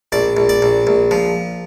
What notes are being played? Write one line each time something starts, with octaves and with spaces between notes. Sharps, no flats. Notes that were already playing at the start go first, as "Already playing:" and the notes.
A#1 D5
A#1
D5
A#1
A#1
F3